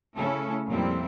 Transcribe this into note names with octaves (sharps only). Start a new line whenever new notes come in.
C#3 A3 C#4 E4 A4
F2 A#2 G3 C4 E4